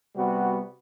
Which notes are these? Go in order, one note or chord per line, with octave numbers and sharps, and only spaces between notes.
C3 G3 B3 F#4